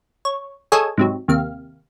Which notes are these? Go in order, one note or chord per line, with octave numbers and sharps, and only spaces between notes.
C#5
G#4 A4 C#5 D#5 G#5
G#2 C3 F#3
D#2 C3 F5